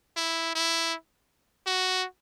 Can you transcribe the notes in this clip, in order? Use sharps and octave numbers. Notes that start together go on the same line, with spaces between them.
E4
E4
F#4